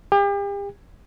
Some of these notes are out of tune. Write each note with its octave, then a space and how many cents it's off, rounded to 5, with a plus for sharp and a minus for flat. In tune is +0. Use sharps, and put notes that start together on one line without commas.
G4 +40